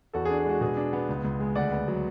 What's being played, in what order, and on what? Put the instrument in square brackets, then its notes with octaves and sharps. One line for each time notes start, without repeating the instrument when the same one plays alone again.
[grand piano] E2 F#4 A4
G#4
D4
G#4
G#3 F#4
B2 G#4
D4
B3
C#2
C#2
G#3
D2 D5 F#5
B3
F#3